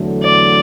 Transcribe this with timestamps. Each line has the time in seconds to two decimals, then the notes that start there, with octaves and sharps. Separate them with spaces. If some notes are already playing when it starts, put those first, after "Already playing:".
Already playing: E2 D3 F#3 A3
0.23 D5